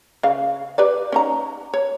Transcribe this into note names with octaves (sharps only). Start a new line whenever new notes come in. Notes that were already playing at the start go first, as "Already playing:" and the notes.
C#3 F5
G4 B4 D5
C#4 D#4 A#5
C#5